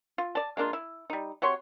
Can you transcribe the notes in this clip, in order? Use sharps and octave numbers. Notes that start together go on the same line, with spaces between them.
F4
D5 A5
G#3 A#3 D4 F4
E4
G3 D#4
C3 F#4 C#5 C6